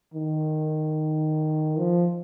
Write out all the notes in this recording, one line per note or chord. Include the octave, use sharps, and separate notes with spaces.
D#3
F3